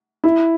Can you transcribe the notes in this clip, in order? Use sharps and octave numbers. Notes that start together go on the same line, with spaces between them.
E4